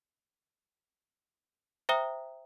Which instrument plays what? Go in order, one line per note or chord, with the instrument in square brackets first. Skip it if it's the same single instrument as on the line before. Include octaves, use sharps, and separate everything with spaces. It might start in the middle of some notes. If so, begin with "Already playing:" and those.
[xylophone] C5 E5 G5 A#5 D#6 G7